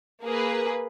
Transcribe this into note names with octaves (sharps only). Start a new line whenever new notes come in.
A#3 G#4 B4